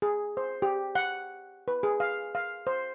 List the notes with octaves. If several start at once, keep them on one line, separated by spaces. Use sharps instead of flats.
G#4
C5
G4
F#5
B4
G#4
F5
F5
C5